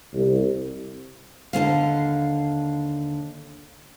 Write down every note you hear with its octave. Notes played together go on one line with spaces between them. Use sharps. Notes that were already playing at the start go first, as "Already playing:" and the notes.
C2
D#2 D3 E3 F5